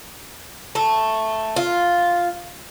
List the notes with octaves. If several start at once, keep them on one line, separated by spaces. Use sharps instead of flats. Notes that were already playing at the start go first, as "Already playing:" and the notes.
A3
F4